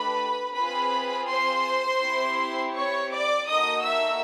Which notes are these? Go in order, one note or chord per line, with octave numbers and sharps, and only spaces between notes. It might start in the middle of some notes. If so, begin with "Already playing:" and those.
Already playing: A3 D4 G4 B4 B5
C4 F4 G#4 B4 B5
C5 C6
C4 E4 G4
C#5 C#6
D5 D6
A#3 D#4 F#4 A4 D#5 D#6
E5 E6